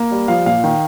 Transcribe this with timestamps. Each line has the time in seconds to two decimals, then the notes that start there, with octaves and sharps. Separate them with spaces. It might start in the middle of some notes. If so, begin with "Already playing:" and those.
Already playing: A#3
0.11 G3
0.28 F3 F5
0.46 A#2 F5
0.64 D#3